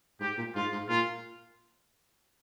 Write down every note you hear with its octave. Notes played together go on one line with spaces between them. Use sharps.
G#2 G4
A#2
G#2 F4
G#2
A#2 F4